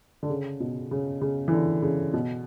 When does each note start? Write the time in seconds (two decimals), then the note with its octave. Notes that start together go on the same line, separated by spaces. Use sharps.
0.23 D3
0.30 C#3
0.60 B2
0.91 C#3
1.21 C#3
1.48 E3
1.52 D3
1.82 C#3
2.14 B2